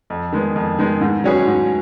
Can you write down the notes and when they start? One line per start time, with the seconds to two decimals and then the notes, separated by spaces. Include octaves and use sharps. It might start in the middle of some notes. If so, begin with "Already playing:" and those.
0.10 F2
0.33 D#3 G#3 B3
0.56 F2
0.79 D#3 G#3 B3
1.01 G#2
1.24 F#3 C#4 G#4 B4
1.47 G#2